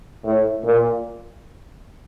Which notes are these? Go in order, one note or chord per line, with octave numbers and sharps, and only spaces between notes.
A2
A#2